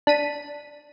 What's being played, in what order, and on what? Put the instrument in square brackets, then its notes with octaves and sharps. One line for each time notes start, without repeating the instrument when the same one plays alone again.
[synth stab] D4 B6 D#7